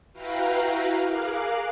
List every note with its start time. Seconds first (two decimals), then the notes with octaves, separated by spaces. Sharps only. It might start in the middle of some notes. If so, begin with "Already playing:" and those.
0.13 E4 F#4 B4 F5 G5 A#5
1.04 G#4 A#4 F5 D6 F#6